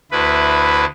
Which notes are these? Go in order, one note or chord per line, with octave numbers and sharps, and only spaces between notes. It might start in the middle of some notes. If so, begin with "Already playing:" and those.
D2 E4 B4